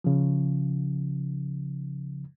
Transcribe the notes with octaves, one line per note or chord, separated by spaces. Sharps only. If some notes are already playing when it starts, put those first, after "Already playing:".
C#3 F3